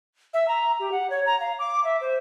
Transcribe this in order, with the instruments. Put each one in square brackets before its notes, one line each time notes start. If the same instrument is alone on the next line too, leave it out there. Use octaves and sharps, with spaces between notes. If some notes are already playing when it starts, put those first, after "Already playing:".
[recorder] E5
A#5
G4
F#5
C#5
A#5
F5
D6
E5
C5